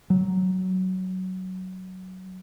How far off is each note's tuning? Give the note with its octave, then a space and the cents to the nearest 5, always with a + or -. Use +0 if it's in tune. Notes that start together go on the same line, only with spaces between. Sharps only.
F#3 +10